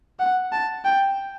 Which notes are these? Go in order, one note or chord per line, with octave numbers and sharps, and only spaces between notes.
F#5
A5
G5